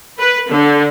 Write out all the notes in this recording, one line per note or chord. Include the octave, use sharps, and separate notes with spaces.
B4
D3